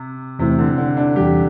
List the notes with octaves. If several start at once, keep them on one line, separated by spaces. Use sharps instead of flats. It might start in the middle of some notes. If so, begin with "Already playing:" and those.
Already playing: C3
E2 C3 E3 A3 C4 E4
D3
D3
D4
E2 E3 G3 G4